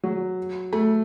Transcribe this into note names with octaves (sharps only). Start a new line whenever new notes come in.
F#3
A3